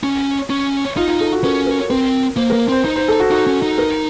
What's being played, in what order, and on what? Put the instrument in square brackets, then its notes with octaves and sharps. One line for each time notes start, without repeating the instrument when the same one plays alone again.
[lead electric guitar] C#4
C#4
[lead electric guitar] D#4 [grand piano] F4
[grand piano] F4
A4
F#4
[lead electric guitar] C#4 [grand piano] A#4
[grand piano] A#4
[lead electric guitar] C4 [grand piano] A#4
[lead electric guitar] A#3 [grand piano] C5
[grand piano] A#4
[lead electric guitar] A#3
[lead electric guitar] C4 [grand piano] C5
[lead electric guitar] D#4 [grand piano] C5
[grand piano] C5
A4
F#4
[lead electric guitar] D#4 [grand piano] F#4
[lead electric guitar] C#4
D#4
[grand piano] A#4